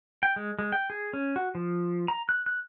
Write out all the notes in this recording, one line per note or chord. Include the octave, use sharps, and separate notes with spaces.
G5
G#3
G#3
G5
G#4
C#4
F#4
F3
A#5
F#6
F#6